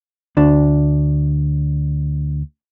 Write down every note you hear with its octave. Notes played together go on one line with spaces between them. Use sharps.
D2 D4